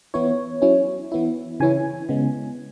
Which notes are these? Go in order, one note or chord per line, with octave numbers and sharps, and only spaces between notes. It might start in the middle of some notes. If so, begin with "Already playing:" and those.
E3 B3 E4 C#5
F#3 C#4 E4
E3 B3 E4
C#3 E3 C#4 E4 G#5
C#3 G#3 B3